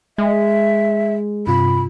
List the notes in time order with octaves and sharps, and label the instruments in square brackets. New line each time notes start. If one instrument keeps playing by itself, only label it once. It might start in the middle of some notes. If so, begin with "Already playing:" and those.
[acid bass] G#3 [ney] E5
[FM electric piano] G2 C3 F4 [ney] B5